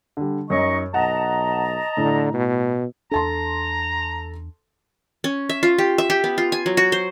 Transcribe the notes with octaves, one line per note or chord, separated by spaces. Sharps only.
D3 G3
F#2 D#4 C#5 D#5 C#6
B1 D#5 F#5 A5 A#5
A2 D3
B2
E2 D4 A4 A5 A#5 C6
C#4
E5
F4
G4
E5
G4
B3
F4
G#5
F#3
F#4
C5